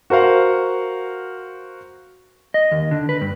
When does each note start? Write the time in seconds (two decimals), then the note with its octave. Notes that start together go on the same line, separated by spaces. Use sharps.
0.10 F#4 A#4 C5 F5 F#5
2.54 D#5
2.71 D#2
2.91 D3
3.09 B4
3.21 G2